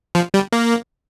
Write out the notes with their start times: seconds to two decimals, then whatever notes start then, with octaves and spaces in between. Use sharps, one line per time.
0.15 F3
0.34 G3
0.52 A#3